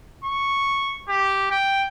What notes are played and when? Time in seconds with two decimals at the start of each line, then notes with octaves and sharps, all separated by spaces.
0.25 C#6
1.09 G4
1.51 G5